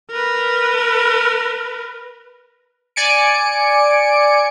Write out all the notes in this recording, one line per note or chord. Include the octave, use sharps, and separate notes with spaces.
A#4 B4
D5 G#5 C#7 D7